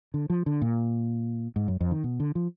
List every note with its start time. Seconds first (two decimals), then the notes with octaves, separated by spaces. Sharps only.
0.14 D3
0.30 F3
0.46 D3
0.62 A#2
1.56 G#2
1.68 F#2
1.81 F2
1.91 D#3
2.04 B2
2.20 D3
2.35 F3